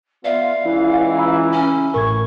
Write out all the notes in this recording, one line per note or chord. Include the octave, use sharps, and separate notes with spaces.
B3 F4 D5 E5 F5
C#2 E3 E4
A#5 B5 E6
C#4
A1 A2 A#4 C#6 G#6